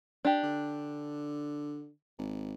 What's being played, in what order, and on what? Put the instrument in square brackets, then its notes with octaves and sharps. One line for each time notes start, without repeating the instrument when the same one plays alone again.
[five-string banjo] D4 G4
[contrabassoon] D3
G#1